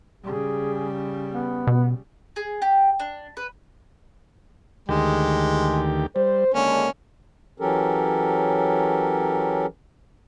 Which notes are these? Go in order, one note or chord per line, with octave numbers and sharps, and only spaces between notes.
C#3 G3 G#4
B3
B2
G#4
G4
D4
B4
D2 D#3 G#3 G4
G3 C5
D#2 D3 G#3 A#3 C#4
E3 F#3 C#4 G4 A4 A#4